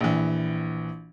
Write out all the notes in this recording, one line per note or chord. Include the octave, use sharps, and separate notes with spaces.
A#1 E3